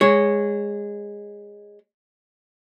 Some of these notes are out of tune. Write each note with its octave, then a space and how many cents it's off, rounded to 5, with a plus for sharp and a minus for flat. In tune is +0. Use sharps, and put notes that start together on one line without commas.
G#3 -15 C#5 +0